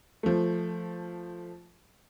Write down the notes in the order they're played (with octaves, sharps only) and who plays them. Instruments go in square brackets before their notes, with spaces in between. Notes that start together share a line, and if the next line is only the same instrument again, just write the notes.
[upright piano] F3 A3